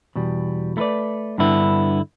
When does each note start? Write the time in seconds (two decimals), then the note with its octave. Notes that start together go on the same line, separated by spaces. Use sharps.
0.16 E2 B2 G3
0.77 A3 E4 B4 D5
1.38 G2 D3 B3 E4